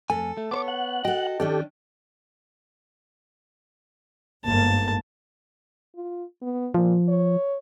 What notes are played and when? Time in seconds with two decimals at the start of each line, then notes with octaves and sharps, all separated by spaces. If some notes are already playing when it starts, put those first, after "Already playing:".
0.10 F2 A3 A4 G#5
0.37 A3
0.51 B3 C5 C#5 D6
0.68 F#5
1.05 F#4 A4 D#5 G5
1.40 D#3 C#4 D4 G4 A4
4.45 G1 G#2 A#3 A5
5.96 F4
6.42 B3
6.74 A#2 F3
7.08 C#5